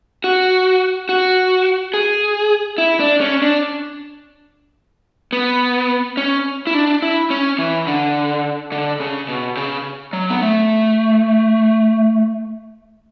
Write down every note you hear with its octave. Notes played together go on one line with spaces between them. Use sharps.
F#4
F#4
G#4
E4
D4
C#4
D4
B3
C#4
E4
D4
E4
C#4
E3
D3
D3
C#3
B2
C#3
F#3
B3
A3